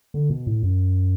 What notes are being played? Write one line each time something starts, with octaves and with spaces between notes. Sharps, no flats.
D3
B2
A2
F#2